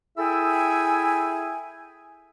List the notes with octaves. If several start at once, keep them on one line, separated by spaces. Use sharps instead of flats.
E4 G#4 A4 E5 G5 G#5